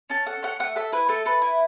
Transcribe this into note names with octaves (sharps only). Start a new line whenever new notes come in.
C#4 A5
A4 F#5
C#4 F#5
A3 F#5
A4 E5
E4 B4
A3 A4
A4 B4
E4